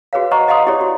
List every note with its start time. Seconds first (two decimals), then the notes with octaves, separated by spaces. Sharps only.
0.13 F#4 G#4 B4 C#5 F5
0.31 C5 D#5 F#5 A#5 C#6 D6
0.48 D#5 F5 F#5 C6 D#6
0.67 E4 G4 G#4 C#5 D5
0.81 F#4